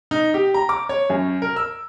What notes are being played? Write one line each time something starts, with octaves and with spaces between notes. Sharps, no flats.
D#4
G4
A#5
D6
C#5
F#2
A#4
E6